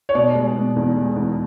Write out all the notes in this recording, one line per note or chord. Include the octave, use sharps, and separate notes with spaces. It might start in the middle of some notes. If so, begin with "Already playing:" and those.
C#5
B2 D5
G#3
B2
E2
G#3
E2